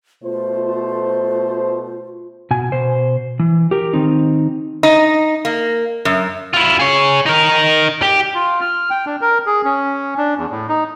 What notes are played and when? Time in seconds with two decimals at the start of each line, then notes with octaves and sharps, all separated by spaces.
0.23 B2 A3 F4 C5
2.51 B2 G#5
2.72 B2 C5
3.39 E3
3.71 G4 A#4
3.93 D#3 C4 D#4
4.83 D#4
5.45 A#3
6.05 F#2
6.54 E4 F4
6.80 G#4 C#5
7.26 D#4 A#4
8.02 G4
8.35 F4
8.61 F6
8.90 G5
9.06 D4
9.21 A#4
9.46 G#4
9.65 C#4
10.18 D4
10.37 E2
10.50 A2
10.69 D#4